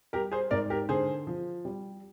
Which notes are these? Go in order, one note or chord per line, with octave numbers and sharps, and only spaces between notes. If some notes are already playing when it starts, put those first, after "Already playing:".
G3 G4 A#4
G#4 C5
G#2 A#4 D5
G4 A#4
D3 G#4 C5
F3
G3